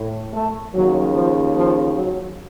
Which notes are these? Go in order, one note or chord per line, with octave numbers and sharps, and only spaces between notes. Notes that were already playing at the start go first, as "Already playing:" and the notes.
Already playing: A2
A3
D#2 C#3 F#3
F3
F3
F#3